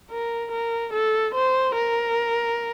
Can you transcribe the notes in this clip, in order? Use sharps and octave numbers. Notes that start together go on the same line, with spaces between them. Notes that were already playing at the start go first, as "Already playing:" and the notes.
A#4
A#4
A4
C5
A#4